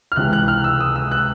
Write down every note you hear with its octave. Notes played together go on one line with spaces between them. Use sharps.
F6
C#2 C3 E3 F#6
F#6
F6
E6
D#6
E6
F#6